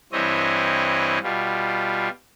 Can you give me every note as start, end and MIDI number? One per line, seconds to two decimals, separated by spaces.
0.12 1.19 43
0.12 1.19 52
0.12 1.19 60
0.12 1.19 64
0.12 1.19 73
0.12 1.19 75
1.23 2.09 47
1.23 2.09 55
1.23 2.09 65